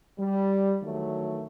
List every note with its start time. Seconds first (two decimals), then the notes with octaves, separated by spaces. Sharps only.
0.18 G3
0.82 D#3 E3 F#3 A3